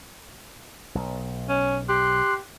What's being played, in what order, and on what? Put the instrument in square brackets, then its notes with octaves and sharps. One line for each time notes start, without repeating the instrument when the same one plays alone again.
[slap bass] B1
[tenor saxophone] C#4
[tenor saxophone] G4 [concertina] C6 F#6